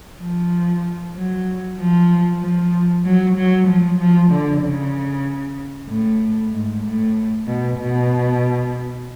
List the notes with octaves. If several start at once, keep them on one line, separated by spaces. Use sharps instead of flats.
F3
F#3
F3
F3
F#3
F#3
F3
F3
D3
C#3
A2
G#2
A2
B2
B2